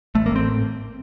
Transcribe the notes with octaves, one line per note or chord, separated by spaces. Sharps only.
A1 A3
A#3
A2 C4